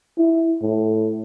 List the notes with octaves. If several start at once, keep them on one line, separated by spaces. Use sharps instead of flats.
E4
A2